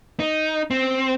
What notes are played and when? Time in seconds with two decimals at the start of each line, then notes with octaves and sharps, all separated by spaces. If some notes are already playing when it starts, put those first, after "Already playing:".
0.20 D#4
0.71 C4